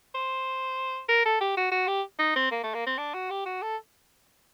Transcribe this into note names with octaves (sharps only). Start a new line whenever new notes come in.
C5
A#4
A4
G4
F#4
F#4
G4
D#4
C4
A#3
A3
A#3
C4
D4
F#4
G4
F#4
A4